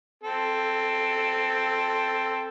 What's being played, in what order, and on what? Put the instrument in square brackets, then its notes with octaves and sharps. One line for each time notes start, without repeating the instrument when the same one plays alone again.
[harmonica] C4 A4